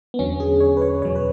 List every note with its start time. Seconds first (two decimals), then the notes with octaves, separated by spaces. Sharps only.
0.14 B3
0.19 E2 D3 F#3 C#4
0.40 G#4
0.61 C#5
0.77 B4
0.82 C#5
1.02 E2 B2 F#3 C#5
1.15 B4